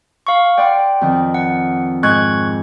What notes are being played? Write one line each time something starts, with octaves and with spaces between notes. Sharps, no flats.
F5 C#6
D5 F#5 G5 C6
F2 D#3
F#5
G#2 C#6 F#6 G#6